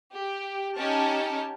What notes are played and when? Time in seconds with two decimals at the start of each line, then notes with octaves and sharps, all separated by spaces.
0.14 G4
0.78 C#4 D#4 G4 A5 F6